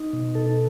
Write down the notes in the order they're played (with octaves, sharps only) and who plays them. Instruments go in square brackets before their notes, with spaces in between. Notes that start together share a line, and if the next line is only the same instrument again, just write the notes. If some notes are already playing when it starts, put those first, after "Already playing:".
Already playing: [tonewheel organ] D#4
B2
A4